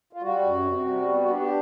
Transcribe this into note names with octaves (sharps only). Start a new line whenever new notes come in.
F4
G3 F#4
F#2
C3
G3
B3 F#4
F#4
D4 G4
G4